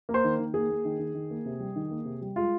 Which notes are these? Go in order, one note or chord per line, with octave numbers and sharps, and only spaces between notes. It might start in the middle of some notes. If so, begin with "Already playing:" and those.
A#3
C5
D#3
D#3
A#3 G#4
A#3
D#3
D#3
D#3
A#3
C3
G3
D#3
A#3
C3
G3
G#3 F4